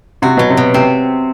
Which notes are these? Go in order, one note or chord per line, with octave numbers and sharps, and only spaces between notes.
C3 F#4
B2 F#3
C3
B2
C3 C4